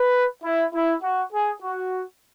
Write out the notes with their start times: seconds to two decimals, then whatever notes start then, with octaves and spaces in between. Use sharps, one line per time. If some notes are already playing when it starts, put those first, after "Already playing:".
Already playing: B4
0.44 E4
0.73 E4
1.02 F#4
1.32 G#4
1.61 F#4